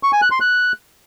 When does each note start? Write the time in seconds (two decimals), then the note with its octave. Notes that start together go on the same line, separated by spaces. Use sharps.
0.03 C#6
0.13 G#5
0.22 F#6
0.31 C6
0.41 F#6